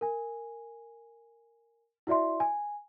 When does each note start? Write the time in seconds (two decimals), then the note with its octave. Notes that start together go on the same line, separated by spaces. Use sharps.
0.01 A#4 G#5
2.07 E4 F#4 D5 E5 C6
2.40 G#5